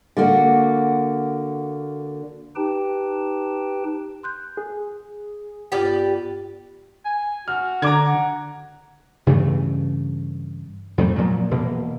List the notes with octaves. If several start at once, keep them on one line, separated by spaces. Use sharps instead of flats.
D3 A#3 F#4
D#4 G4 B4 G5 A5
C6 F#6 G6
G#4
G2 B3 F4 G4 B4 D5
G#5
F#4 F6
D3 A#5 D6 G#6
F#5
G2 C#3 E3 A3
F2 G#2 G3 A3
A#2 F3 F#3
E1 B2 A#3